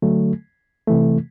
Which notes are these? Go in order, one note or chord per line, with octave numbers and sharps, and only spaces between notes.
D3 F#3 A3
C3 E3 A3